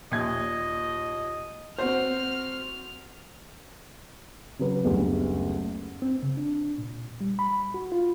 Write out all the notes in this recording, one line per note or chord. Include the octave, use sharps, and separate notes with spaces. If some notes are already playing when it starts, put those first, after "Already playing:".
D#2 A#2 D#5 G#6
C4 F#4 C5 F6
C#3 F#3 B4
F#1 D2 G3 B3
C4
C#3
D4
A#2
G3
B5
F#4
F4